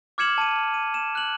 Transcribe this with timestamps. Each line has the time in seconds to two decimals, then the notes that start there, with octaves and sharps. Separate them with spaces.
0.18 D6 F6 G#6 C#7 E7 F#7
0.38 A5 D#7
0.74 D#7
0.94 E7
1.15 F#6 F#7